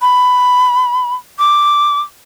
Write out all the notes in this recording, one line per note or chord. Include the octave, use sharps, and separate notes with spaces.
B5
D6